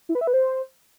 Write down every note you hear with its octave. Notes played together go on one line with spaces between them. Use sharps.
E4
B4
E5
B4
C5